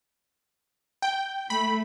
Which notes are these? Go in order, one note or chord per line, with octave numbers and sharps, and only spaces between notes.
G5
A3 B5